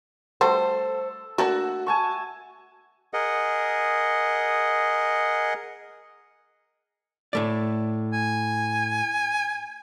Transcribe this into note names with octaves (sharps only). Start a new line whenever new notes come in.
G3 A3 F#4 A4 C5
A3 A#3 D4 F#4 E5
G#5 A5 C#6
G#4 A#4 D#5 F#5
A2 A3 D5
G#5